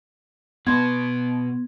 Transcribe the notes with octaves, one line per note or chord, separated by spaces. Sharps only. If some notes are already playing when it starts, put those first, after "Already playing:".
B2 B3 B4 C6 G#6